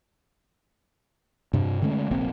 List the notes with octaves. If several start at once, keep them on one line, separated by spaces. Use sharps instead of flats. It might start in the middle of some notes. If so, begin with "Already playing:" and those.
G2 C3
D3 G#3 A3 C#4
F1 A#1 A#3 C4